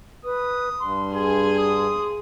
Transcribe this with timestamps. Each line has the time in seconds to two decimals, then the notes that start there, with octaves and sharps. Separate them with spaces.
0.24 B4 D#6
0.79 G2 C6
1.15 G#4 G#5
1.58 D#6